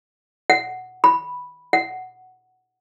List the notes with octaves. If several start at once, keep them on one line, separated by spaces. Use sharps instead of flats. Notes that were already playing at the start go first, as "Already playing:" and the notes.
F#5
B5
F#5